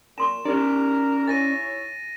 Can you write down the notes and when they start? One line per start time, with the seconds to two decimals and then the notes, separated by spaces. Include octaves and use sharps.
0.18 A#2 A5 C6 C#6 E7
0.45 C#4 D#4 E4 G4 A#4 D5
1.28 E4 C#5 G#5 A6 A#6 D#7